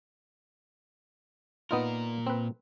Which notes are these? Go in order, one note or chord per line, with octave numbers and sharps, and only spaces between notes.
A#2 B3 D#4 F4 A#4
C4 B4